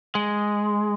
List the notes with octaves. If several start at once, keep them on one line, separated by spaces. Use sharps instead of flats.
G#3